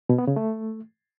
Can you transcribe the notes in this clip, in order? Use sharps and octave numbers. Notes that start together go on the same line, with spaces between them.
B2
B3
C#3
A3